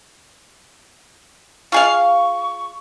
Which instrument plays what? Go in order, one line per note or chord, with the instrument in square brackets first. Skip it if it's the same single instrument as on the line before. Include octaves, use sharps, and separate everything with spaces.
[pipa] F4 G#4 F5 [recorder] C#6